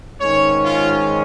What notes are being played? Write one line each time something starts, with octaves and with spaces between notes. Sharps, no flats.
G#2 D#3 G#3 C#4 C#5
F4